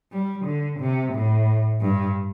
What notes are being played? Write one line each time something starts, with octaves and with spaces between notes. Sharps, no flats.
G3
D3
C3
A2
G2